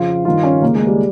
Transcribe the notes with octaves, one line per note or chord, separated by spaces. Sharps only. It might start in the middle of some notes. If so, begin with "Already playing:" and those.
Already playing: F2 C#3 F4
G2 D#3 F4
C#4
D#2 C#3 A#3
G#3
G3